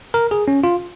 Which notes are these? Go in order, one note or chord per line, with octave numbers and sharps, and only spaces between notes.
A#4
G#4
C#4
F4